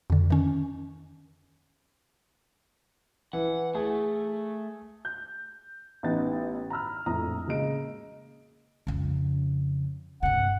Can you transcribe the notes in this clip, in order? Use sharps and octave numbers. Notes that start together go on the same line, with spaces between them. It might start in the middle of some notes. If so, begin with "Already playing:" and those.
F2 D3
D#3 C#4
E3 F#5
A3 G#4
G6
A1 B3 D#4 A6
A#5 B5 E6 F6
A#1 F2 A2 A#5 D#6
C#3 G#3 A#3 D#5 D7
F2 C#3
G2 C3 F#5